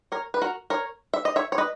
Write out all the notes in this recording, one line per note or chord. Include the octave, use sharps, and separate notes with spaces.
A#4 C#5
B4
F#4 A#4
A#4 C#5
E5
D#5
C#5 E5
C#5
B4 D#5